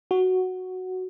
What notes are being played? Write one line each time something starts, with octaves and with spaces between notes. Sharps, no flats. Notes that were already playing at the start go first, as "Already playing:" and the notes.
F#4